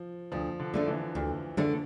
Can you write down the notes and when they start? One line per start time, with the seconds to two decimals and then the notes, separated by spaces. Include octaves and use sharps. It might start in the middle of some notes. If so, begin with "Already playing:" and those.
Already playing: F3
0.32 D2 F3
0.60 D3
0.74 D3 A3 D4
0.87 E3
1.15 D2
1.57 D3 A3 D4